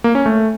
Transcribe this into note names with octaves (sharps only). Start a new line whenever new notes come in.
A#3
C#4
A3